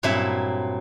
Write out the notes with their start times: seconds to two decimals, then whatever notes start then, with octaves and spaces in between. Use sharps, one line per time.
0.03 G2 A#2 F#3 C4 E4 E5